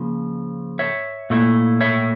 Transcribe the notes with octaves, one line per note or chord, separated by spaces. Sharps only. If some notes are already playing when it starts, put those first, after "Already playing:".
Already playing: C#3 F3 A#3
C#5 E5
A#2 A3 E4
C#5 E5